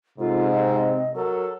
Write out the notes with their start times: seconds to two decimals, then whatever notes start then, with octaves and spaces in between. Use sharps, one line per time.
0.18 G#2 C3 F4 A4
0.52 C4 D#5
1.14 F#3 A4 A#4